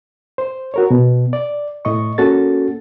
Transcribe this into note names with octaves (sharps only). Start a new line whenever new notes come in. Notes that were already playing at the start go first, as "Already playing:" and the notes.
C5
F#4 A#4 C#5
B2
D5
A2 D#5 C#6
A#3 C#4 F#4 A4 A6